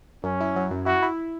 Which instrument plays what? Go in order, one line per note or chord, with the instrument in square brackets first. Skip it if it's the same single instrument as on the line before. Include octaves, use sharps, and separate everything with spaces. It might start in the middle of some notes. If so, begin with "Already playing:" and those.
[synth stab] F#2 [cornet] C#4
[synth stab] E4
F#3
F#2
[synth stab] E4 [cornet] F#4
[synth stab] E4